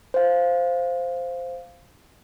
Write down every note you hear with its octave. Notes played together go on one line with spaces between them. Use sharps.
C5 F5